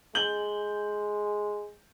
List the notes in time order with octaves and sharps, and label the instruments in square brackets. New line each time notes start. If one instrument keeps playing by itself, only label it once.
[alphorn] G#3 [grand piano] G6 F#7